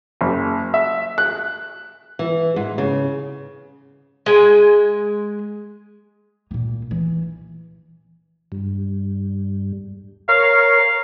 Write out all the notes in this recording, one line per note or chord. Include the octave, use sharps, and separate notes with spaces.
F#1
E5
F#6
E3
G#2
C#3
G#3 G#5
A#2 A#3
E3
G2
A#4 C#5 F5